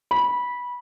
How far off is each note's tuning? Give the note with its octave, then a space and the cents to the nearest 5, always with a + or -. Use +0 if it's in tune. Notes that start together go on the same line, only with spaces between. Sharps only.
B5 -15